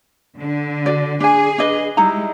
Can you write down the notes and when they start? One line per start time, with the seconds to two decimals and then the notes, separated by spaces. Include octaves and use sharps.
0.38 D3
0.86 F#4 D5
1.20 D4 G#4 G#5
1.58 D4 B4 D#5
1.97 G3 G#3 D#4 E4 A#5